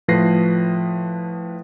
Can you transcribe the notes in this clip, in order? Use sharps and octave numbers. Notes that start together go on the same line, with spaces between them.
A2 F3 B4 A#6 C7